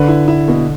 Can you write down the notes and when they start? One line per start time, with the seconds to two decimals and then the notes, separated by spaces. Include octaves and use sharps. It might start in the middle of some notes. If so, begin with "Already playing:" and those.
Already playing: D3 B4
0.08 E4
0.28 E4
0.48 B2